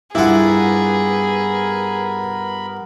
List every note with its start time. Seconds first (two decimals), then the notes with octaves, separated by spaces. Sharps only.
0.15 G2 B3 E4 F4 G#4 A#4 F#5 B5